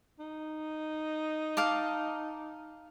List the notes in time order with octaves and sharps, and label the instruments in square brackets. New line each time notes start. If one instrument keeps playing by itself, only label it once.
[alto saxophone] D#4
[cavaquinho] F5 A5 D6